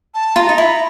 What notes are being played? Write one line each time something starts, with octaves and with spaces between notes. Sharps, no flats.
A5
F4 A#5 B5
D#4
E4